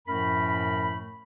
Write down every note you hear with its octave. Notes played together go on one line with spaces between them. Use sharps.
F#2 A2 F3 A3 A#4 B5